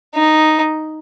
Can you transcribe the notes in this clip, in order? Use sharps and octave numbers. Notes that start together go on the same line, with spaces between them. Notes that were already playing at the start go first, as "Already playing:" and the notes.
D#4